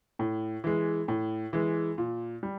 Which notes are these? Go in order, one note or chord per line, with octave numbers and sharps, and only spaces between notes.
A2
E3 G#3
A2
E3 G#3
A#2
G3